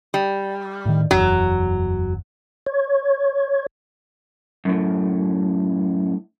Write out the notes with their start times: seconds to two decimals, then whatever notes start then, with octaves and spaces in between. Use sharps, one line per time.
0.14 G3
0.85 A2 D#3
1.11 F#1 E2 F#3
2.66 C#5
4.65 F#2 A2